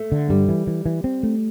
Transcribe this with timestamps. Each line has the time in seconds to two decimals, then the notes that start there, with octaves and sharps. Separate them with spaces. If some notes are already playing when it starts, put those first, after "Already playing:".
Already playing: A3
0.12 D3
0.29 G2 G3
0.49 E3
0.67 E3
0.86 E3
1.04 C4
1.23 A3